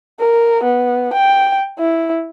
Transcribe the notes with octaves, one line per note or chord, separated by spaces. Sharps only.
A#4
B3
G5
E4